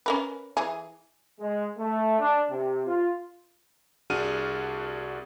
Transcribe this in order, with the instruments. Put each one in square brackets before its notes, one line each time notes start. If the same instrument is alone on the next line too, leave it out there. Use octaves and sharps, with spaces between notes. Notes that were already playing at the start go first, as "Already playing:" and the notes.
[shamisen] C#4 A#4 B4
E3 G#4
[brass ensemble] G#3
A3
D4
C3
F4
[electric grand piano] C2 D4 F#4 G#4 F6 D#7